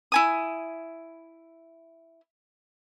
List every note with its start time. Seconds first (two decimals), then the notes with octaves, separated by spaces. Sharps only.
0.12 E4 G#5 D#6